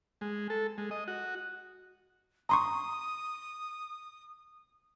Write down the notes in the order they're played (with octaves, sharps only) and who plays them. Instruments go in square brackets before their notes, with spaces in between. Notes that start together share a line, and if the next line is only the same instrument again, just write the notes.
[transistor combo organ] G#3
A4
G#3
D#5
F#4
[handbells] A#5 C6 C#6 [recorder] D#6